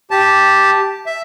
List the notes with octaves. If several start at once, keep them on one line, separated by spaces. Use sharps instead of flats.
G4 A5
E5